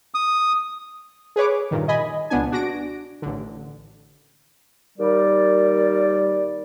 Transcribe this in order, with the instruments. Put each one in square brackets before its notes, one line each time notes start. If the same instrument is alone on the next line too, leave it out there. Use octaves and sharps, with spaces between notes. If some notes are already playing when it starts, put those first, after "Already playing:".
[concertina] D#6
[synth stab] G#4 B4 C#5 D6
G2 A#2 D#3
D#5 G#5 B5
C#2 B2 B3 D4 G#5
D4 F#4 A#6 D7
A1 D3
[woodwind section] D#2 G3 A#4 D5